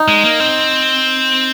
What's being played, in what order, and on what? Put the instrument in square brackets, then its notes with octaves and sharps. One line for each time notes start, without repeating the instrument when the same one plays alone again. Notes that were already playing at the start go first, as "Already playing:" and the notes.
Already playing: [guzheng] D#4
[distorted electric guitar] G#3
A#3
C4